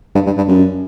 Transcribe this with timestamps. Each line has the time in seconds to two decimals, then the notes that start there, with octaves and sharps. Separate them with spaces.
0.15 G2
0.26 G2
0.37 G2
0.48 F#2